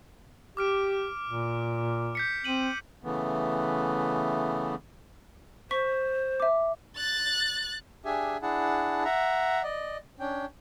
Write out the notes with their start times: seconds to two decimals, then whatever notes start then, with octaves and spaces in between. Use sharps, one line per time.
0.57 G4 D6 F6 D7
1.29 A#2
2.15 G6 B6 C#7
2.44 C4 D#7 F#7
3.04 C#3 E3 A3 B3
5.71 C5 C#6 B6
6.40 E5 D6
6.96 F#6 A6
8.05 D4 G4 G#4 E5 G#5
8.42 D4 E4 G#4 F#5 A5
9.05 E5 F#5 A#5
9.63 D5 D#5
10.20 C#4 D4 G5